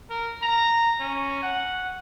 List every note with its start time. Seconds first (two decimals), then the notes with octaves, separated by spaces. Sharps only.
0.10 A#4
0.42 A#5
1.00 C#4
1.42 F#5